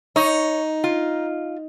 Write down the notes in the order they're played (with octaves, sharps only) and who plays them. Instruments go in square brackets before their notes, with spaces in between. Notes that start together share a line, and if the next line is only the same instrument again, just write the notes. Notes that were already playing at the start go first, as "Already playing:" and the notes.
[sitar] D#4 [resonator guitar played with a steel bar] C#5
[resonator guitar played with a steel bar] F4